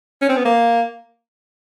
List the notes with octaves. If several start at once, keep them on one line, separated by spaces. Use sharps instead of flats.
C#4
C4
B3
A#3